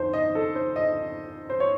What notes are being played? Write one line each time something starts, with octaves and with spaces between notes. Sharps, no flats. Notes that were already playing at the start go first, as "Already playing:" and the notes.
Already playing: F2 D#3 C5
D#5
A4
C5
D#5
C5
C#5